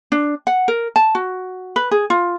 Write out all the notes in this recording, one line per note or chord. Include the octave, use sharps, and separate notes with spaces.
D4
F#5
A#4
A5
F#4
B4
G#4
F4